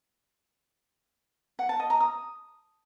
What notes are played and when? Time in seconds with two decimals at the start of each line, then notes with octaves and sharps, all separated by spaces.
1.59 F#5
1.69 A5
1.80 D#5
1.90 A#5
2.00 D#6